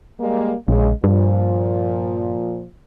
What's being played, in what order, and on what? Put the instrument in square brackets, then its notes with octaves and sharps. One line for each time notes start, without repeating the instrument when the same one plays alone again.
[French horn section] G3 G#3 A#3
[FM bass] A#1 [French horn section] C#3 G#3
[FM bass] G2 [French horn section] A#2 F3